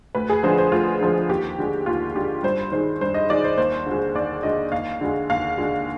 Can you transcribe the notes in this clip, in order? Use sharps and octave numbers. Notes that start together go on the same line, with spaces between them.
D2 B4
G#4
D3 F3 G#3 C5
C5
D2 F4
D3 F3 G#3
D#2 G4
D3 G#3
D#2 F4
D3 G#3 G4
G2 C5
D#3 G#3 C5
G2 C5
D#5
D#3 G#3 D5
C5
D#2 C5
D3 G#3
D#2 D5
D3 G#3 D#5
D#2 F5
D3 G#3
D#2 F5
D3 G#3